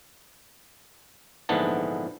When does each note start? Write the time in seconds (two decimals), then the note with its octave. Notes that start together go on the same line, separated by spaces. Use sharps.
1.49 A#1 G#2 D3 E3 B3 A5